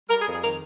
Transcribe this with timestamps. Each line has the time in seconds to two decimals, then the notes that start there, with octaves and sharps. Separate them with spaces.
0.09 G3 A#4
0.20 G#4
0.26 F2
0.32 G#4
0.42 D#3 A#4